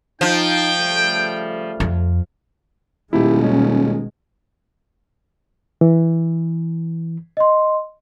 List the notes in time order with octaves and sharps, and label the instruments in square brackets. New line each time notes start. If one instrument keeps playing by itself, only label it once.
[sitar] F3 [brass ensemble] D#4 [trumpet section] G5
[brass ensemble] C#3 G3 A3
[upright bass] F2
[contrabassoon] D#1 [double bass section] B2 D#3 G#3 [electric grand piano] E4 G4
[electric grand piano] C#4
[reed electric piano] E3
[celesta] D#5 C6